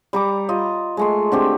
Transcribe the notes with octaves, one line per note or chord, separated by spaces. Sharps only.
G3 A#5 D6
F4 D#5
G#3 A3 C6
D3 C4 G4